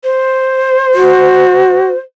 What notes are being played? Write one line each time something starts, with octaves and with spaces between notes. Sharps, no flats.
C5
F#4